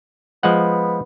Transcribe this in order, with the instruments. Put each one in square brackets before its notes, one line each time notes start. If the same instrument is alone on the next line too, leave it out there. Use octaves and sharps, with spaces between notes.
[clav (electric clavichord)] F3 G#3 F#5 [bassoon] B3